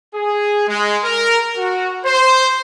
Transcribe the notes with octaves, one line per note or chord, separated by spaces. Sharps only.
G#4
G#3
A#4
F#4
C5